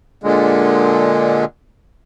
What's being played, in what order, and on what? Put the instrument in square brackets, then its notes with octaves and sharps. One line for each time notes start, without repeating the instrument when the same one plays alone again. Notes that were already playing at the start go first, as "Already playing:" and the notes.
[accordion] A#2 D3 G#3